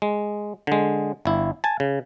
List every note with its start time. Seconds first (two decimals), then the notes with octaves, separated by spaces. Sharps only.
0.02 G#3
0.67 D3 G#3
1.25 G1 E4
1.64 G#5 A5
1.80 C#3